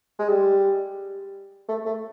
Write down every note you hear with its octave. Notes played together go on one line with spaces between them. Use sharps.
G#3
G3
A3
A3